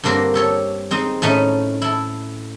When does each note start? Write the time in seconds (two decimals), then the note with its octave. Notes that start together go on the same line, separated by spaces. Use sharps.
0.04 G2 D3 A#3 C4 A#4
0.34 G4 A4 C#5
0.91 G#3 C4 D#4
1.22 A2 A3 C#4 D#4
1.82 E4 A4